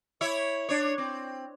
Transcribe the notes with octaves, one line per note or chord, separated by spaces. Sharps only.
E4 C#5 E5
D4 C#5
C4